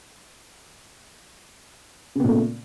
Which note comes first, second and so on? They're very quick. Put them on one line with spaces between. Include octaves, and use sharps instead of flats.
C#3 B3 A#2 A3